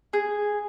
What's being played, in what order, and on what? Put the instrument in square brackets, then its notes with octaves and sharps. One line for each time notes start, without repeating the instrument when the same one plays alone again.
[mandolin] G#4